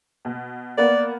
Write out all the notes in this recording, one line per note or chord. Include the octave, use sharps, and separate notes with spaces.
B2
A#3 B3 D5